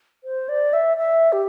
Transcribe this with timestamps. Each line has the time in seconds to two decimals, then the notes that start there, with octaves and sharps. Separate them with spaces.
0.24 C5
0.49 D5
0.73 E5
0.97 E5
1.32 G4